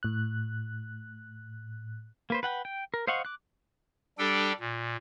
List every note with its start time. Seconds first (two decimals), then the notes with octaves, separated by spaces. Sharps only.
0.03 A2 F#6
2.30 A#3 B4 C5
2.43 B4 F#5 G5
2.65 G5
2.94 A#4
3.07 C5 D#5 F5 F#5 C#6
3.25 D6 F#6
4.19 G3 D4 G4 A4 G5
4.60 A#2